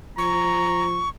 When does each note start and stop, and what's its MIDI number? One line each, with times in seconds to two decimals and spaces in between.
0.18 1.03 53
0.18 0.86 82
0.18 1.09 85